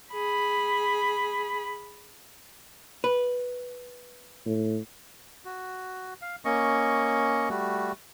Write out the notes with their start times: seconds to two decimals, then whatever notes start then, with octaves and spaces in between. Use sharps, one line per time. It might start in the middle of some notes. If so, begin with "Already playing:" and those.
0.13 G#4 B5
3.04 B4
4.46 A2
5.45 F#4
6.22 F5
6.45 A#3 C#4 D#5 C#6
7.50 G3 A3 F#4